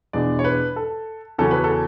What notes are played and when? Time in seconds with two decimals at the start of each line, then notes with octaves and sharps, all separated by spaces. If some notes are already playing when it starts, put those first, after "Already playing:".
0.13 E2 B2 G#3 D4 D5
0.39 C#5
0.44 B4
0.76 A4
1.38 E2 C#3 F#3 C#4 A4
1.51 B4
1.64 A4